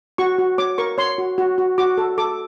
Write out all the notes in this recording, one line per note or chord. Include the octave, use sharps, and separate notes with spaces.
F#4 C#6
F#4
C#5 D6
A#4 C#6
C#5 C6
F#4
F#4
F#4
F#4 D6
A4
A4 D6